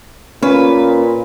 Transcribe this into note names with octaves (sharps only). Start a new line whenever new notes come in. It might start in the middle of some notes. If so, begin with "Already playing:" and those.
A#2 C#4 B4